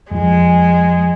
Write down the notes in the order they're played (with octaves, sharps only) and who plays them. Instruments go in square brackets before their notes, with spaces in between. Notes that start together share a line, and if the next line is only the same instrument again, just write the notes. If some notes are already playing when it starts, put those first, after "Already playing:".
[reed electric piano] F2 F3 [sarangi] G#3